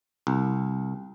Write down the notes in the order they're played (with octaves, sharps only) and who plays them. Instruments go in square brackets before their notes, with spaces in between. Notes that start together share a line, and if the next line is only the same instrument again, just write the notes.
[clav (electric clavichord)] C2